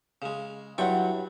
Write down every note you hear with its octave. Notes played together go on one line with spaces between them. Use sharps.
C#3 G#3
G2 F#3 E4 F4 F#5 G5 C#6